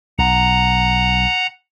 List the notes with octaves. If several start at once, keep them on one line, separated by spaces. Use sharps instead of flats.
B1 F#5 A#5